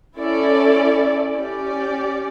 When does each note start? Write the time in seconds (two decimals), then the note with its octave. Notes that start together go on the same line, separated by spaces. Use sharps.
0.18 C#4 E4 A4 D5
1.36 C#4 G4 D5